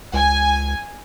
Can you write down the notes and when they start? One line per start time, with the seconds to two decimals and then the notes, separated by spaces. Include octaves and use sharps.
0.14 C#2 G#5